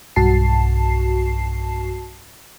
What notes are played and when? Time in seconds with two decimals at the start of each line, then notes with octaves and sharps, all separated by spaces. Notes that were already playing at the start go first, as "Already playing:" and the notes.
0.16 B1 G2 F#4 A5 C7